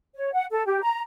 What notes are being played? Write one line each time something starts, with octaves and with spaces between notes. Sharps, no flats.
C#5
F#5
A4
G4
A#5